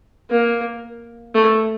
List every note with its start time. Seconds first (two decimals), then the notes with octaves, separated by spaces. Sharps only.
0.31 A#3
1.35 A3